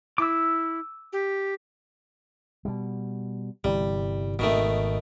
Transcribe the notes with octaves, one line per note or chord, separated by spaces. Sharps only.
E4 D6 E6
G4
B2 G3
G1 C3 E3 G3
G#1 B2 D3 D#3 A3